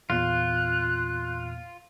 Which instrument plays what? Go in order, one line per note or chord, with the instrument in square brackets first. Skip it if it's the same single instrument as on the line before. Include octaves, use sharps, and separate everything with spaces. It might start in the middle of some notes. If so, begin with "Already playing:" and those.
[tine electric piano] E2 A#2 [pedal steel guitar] F4 [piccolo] F#6